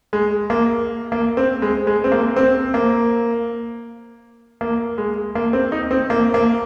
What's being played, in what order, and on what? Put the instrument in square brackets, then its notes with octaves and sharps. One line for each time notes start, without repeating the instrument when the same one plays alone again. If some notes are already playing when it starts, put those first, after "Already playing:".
[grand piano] G#3
A#3
A#3
C4
G#3
G#3
C4
A#3
C4
A#3
A#3
G#3
A#3
C4
D#4
C4
A#3
A#3